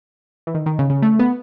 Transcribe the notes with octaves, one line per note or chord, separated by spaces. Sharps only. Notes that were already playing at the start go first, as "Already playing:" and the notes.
E3
D#3
D#3
C#3
C#3
A3
B3